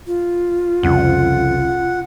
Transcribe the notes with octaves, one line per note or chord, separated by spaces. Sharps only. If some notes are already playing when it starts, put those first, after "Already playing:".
F4
C2 F2 C#3 F#5